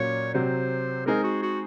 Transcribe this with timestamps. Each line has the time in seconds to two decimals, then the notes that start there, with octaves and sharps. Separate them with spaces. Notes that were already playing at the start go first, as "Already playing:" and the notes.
Already playing: A#2 F#3 A#3 C#4 C#5
0.34 C3 F#3 C4 C5
1.06 G#3 C4 D#4 G#4 A#4
1.24 F#4
1.42 F#4